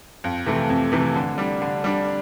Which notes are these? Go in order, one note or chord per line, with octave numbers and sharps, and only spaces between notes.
F2
C3 E3 A3
F2
C3 E3 A3
D3
G3 D4
D3
G3 D4